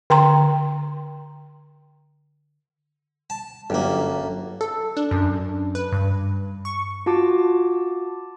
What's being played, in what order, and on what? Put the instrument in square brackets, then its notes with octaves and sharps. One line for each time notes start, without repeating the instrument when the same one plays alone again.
[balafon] D3 G5 A#5 C6
[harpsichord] A5
[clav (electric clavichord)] G1 G4 [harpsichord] F#2 A#3
[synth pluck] A4
D4
F#2
B4
G2
C#6
[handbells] F4 F#4 A5 D6